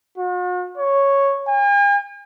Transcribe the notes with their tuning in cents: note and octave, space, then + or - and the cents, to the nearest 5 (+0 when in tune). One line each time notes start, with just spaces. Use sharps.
F#4 -45
C#5 -5
G#5 -45